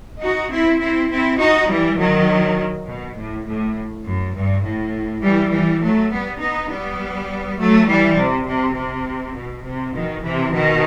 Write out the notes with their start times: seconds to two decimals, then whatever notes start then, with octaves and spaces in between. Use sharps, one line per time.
0.21 D#4 F#4
0.51 C4 E4
0.80 C4 E4
1.10 C4 E4
1.39 D#4 F#4
1.69 E3 G3
1.98 D#3 F#3
2.86 B2
3.16 A2
3.46 A2
4.05 F#2
4.34 G2
4.63 A2
5.22 E3 G3
5.51 E3 G3
5.81 F#3 A3
6.10 G3 B3
6.40 B3 D#4
6.69 G3 B3
7.57 F#3 A3
7.87 E3 G3
8.16 C3
8.46 C3
8.75 C3
9.34 B2
9.64 C3
9.93 B2 D#3
10.22 C3 E3
10.53 B2 D#3